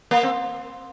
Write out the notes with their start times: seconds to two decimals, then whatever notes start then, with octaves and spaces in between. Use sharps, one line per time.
0.11 A#3
0.23 C4